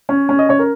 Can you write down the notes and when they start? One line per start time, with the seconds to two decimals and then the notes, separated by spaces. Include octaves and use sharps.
0.09 C#4 C#5
0.29 C#4
0.39 D#5
0.49 C#4 C#5
0.59 A#4